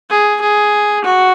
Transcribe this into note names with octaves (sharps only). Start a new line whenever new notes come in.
G#4
G#4
F#4